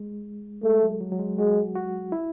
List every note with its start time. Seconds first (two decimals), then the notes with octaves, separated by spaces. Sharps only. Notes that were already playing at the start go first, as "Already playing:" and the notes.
Already playing: G#3
0.63 G#3 A3
0.83 F#3
1.01 F#3
1.12 F#3
1.19 G#3
1.38 G#3 F#4
1.75 F#4
2.12 E4